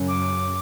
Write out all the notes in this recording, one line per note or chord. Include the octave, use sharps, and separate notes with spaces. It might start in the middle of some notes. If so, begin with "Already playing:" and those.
Already playing: F#2 C#3 F#3 C#4
D6